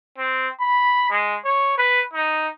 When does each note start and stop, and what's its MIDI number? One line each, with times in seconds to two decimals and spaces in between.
0.18 0.48 60
0.60 1.09 83
1.10 1.35 56
1.44 1.75 73
1.78 2.02 71
2.13 2.48 63